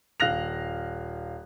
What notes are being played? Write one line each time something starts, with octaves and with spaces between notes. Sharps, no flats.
D#1 F5 F#6 A#6 F7